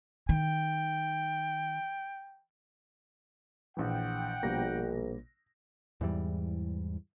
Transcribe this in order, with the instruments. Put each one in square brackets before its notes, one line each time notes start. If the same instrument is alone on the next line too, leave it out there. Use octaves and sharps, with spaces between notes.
[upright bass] D#3 [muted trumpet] G5
[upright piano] A#1 E3 [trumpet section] F#5 G5
[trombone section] A#1 [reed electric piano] B2 G3 A#3 [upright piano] A#6
[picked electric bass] E2 G#2 E3 G3